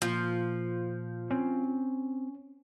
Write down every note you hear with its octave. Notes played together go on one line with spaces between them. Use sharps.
A#2 F3
C4 C#4